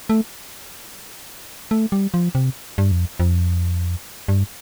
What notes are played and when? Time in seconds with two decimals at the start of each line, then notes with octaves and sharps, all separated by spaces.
0.10 A3
1.71 A3
1.92 G3
2.14 F3
2.35 C3
2.78 G2
2.91 F2
3.20 F2
4.28 G2